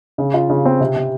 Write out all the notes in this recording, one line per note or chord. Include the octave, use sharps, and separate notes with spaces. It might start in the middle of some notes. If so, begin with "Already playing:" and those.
C#3
F4
C#3
C4
C3
C3